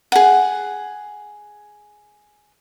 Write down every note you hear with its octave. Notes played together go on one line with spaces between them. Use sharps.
G#4 F#5